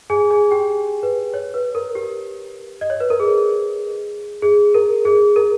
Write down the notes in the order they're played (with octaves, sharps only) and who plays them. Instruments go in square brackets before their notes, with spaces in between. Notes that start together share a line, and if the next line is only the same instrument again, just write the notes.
[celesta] G#4 G#5
G#4 G#5
G4 G5
B4
C#5
B4
A#4
G4
D#5
C#5
B4
A#4
G#4
G#4
A#4
G#4
A#4